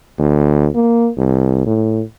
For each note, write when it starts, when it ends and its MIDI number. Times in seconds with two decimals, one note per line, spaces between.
0.19 0.68 38
0.75 1.09 58
1.18 1.64 36
1.66 2.02 45